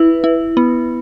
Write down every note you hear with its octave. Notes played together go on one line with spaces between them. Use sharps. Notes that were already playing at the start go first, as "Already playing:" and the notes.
Already playing: E4 B4
E4
B3